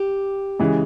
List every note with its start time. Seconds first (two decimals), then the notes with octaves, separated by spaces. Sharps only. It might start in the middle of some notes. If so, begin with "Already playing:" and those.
Already playing: G4
0.59 C#3 E3 G#3